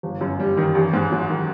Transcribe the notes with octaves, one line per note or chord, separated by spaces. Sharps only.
G1
F#2
G3
D#3
A1
G#2
F#3
D#3